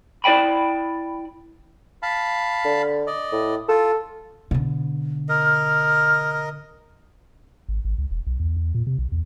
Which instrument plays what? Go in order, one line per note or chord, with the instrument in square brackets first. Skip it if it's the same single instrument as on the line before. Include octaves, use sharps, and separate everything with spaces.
[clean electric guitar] E4 D5 E5 G5 B5
[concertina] F5 A5 B5
[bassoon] D3
[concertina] D5 D#5
[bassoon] A2
[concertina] F4 [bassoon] A4
[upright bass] B2 D3
[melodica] A#4 D#5 [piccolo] F6
[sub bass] G#1
G#1
C#2
E1
B1
E2
E2
A#2
C3
B1
E2